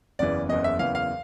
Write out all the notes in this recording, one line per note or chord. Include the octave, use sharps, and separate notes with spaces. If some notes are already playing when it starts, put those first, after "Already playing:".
F#1 E2 C#3 E3 D5
F#1 E2 C#3 E3 D#5
E5
F#1 E2 C#3 E3 F5
F5